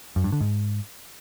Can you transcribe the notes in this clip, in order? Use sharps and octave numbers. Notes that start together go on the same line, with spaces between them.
F#2
G2
D3
G#2